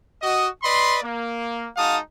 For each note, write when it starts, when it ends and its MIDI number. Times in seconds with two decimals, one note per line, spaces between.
0.22 0.48 66
0.22 0.48 75
0.63 0.98 71
0.63 0.98 74
0.63 0.98 75
0.63 0.98 83
0.63 0.98 84
1.03 1.66 58
1.77 1.98 56
1.77 1.98 63
1.77 1.98 66
1.77 1.98 77
1.77 1.98 81
1.77 1.98 87